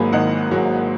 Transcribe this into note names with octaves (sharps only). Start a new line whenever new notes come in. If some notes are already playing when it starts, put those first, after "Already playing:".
Already playing: G#1 G#2 F#3 A#3 G#5 B5
G#1 D#5 F#5
G#2 F#3 A#3